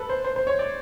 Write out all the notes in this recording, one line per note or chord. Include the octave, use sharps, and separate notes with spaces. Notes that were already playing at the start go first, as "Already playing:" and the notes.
Already playing: A4 B4
C5
C5
C5
C#5
D5